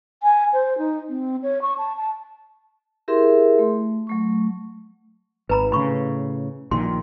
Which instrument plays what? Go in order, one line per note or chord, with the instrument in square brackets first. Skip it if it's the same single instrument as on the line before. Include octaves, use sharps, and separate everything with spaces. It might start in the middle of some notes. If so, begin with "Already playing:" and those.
[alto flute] G#5
C5
D#4
C4
C#5
C#6
A5
A5
[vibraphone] E4 G4 G#4 A#4 E5 C6
A3
F#3 A3 C#6
[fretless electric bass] G#1 [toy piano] B4 A#5 B5
[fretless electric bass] A2 C#3 [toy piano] B5 C#6
[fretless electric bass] A#1 A#2 D#3 [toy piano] C6